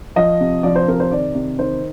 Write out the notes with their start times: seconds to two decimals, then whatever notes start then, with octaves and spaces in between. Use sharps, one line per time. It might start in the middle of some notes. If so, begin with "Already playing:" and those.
0.16 F3 D#5
0.40 C3
0.63 F3 D5
0.76 C5
0.88 C3 A#4
1.00 C5
1.12 D#3 D5
1.35 C3
1.59 D#3 C5